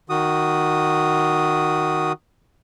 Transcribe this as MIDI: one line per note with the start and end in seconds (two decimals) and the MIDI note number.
0.10 2.12 51
0.10 2.12 66
0.10 2.12 87